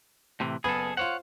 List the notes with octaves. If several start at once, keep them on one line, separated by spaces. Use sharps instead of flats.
A2 C3 E3
F#1 B3 G#4 A4 B5
F4 C5 C#5 F#5